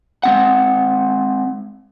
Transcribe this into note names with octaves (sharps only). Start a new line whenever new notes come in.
G#3 C4 F#5